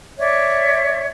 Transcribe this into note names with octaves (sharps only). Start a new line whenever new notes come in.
C#5 D5 E5